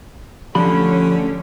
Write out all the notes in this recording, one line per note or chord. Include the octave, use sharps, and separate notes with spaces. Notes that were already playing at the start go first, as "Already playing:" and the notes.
D3 F3 A3 C#4 G4 B5